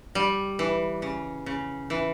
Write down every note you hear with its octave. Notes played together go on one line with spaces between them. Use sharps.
G3
E3
C#3
C#3
E3